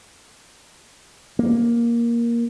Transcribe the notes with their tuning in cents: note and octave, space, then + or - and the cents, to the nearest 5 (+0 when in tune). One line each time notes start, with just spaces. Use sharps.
A#3 +10